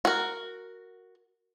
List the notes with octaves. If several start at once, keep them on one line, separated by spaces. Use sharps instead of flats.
F#4 A#4